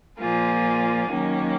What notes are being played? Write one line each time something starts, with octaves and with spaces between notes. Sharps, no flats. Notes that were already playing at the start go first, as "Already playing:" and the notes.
A#2 F3 A#3 F4 G#4
D#3 F#3 A#3 C#4